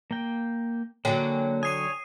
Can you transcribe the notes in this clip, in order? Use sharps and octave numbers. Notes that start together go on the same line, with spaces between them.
A#3 G5
D3 F#3 A#3 C#5 G5 G#5
C#5 G#5 D#6 C7 D#7